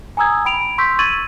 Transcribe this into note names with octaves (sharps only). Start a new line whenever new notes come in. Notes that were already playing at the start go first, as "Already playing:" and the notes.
G#5 A#5 D#6 E6 G#6
G5 B5 D7 F7
C6 C#6 E6 G6 B6
C#6 E6 G#6 A6 D#7 F#7